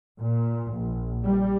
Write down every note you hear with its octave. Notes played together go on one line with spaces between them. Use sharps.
A#2
A#1
G3